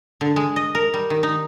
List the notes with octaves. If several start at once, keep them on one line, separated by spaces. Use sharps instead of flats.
D3
G#3
D#5
A#4
G3
D#3
D#4